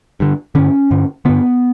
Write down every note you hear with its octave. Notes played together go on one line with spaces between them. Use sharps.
G2 D3
G2 D3 C#4
G2 D3
G2 D3 B3